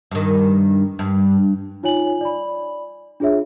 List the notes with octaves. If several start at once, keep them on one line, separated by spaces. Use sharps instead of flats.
G2 D#3
G2
D#4 F4 C#5 G#5 F#7
D5 B5
D4 F4 G#4 C#5 E5